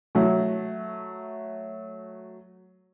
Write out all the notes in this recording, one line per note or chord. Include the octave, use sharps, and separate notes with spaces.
F#3 A3